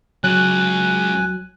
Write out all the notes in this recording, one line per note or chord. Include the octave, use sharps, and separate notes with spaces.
C#2 C#3 F#3 G#5 F#6